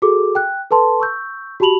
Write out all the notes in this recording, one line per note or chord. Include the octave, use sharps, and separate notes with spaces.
F#4 G#4 A4 D6
G5 F#6
A4 B4 A5 C6
C#6 E6 G6
F#4 G4 A5 B5 F7 F#7